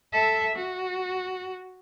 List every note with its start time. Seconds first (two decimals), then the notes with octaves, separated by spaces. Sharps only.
0.13 A4 E5
0.56 F#4